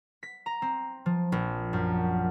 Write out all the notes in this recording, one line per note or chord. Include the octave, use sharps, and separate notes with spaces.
B6
A#5
C4
F3
A#1
F#2